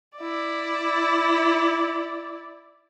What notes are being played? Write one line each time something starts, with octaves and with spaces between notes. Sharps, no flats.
E4 D5